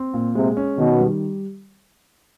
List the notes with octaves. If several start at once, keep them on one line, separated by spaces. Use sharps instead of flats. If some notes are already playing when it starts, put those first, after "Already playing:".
Already playing: C4
A#2
C3 G#3
C#4
B2 D#3
G3